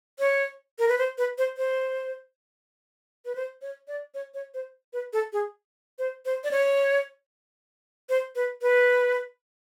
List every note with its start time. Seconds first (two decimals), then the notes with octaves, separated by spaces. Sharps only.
0.19 C#5
0.79 A#4
0.88 B4
0.98 C5
1.18 B4
1.38 C5
1.57 C5
3.25 B4
3.35 C5
3.62 C#5
3.88 D5
4.14 C#5
4.34 C#5
4.54 C5
4.93 B4
5.13 A4
5.33 G#4
5.99 C5
6.25 C5
6.44 D5
6.51 C#5
8.09 C5
8.36 B4
8.62 B4